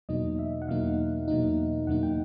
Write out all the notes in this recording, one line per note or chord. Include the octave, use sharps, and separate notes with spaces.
E2 B2 F#3 A#3 D#4 D#5
E5
F#5
E2 B2 F#3 A#3 D#4 F5
E2 B2 F#3 A#3 D#4
E2 B2 F#3 A#3 D#4 F#5
G5